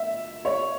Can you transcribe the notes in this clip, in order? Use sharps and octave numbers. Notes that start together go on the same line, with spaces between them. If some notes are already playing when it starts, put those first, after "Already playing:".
Already playing: E5
C#5